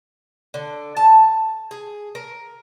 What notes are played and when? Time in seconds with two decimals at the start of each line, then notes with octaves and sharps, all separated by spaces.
0.54 D3
0.97 A5
1.71 G#4
2.15 A#4